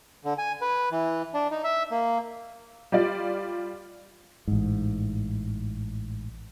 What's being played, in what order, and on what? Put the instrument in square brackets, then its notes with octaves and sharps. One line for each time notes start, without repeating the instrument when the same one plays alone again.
[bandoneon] D3
G#5
B4
E3
D4
D#4
E5
A#3
[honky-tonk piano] G3 F4 D5
[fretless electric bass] A1 G#2